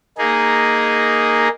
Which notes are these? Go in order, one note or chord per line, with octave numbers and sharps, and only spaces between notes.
A#3 D#4 G#4